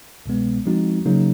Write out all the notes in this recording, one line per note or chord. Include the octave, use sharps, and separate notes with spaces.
C2 B2 G#3 B3
F3 G#3 C4 D#4 F#4
C#3 F#3 A#3 D#4